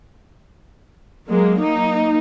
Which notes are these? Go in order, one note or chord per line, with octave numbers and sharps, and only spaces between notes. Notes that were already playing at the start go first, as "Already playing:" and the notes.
F#3 G#3 A#3
A#3 D#4